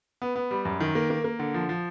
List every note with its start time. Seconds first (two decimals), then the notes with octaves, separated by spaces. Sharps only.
0.22 B3
0.36 B3
0.51 G3
0.65 F#2
0.80 D#3
0.95 A#3
1.10 A#3
1.24 A#3
1.39 D3
1.54 F3
1.69 F3